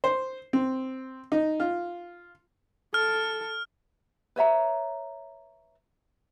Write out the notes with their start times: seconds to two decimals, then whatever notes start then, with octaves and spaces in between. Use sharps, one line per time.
0.04 C5
0.53 C4
1.32 D#4
1.60 F4
2.94 A4 F6
4.36 B4 C#5 E5 A#5